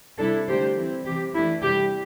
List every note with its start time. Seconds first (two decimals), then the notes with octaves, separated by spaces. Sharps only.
0.19 C3 G3 D4 E4 A4
0.48 D3 A3 D4 G4 C5
0.77 E3 G3 C4 E4
1.06 C3 E3 C4 G4
1.34 E3 A3 D4 E4
1.63 C3 G3 E4 G4